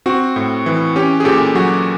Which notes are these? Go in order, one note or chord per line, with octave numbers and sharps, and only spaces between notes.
C4 F#4
A2
E3
C#4 G4
G#4
A#2 G4 A4
F#3 F#4